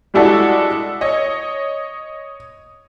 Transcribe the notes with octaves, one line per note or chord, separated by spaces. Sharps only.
G3 G#3 D4 E4 F#4 A4
C#5 D#5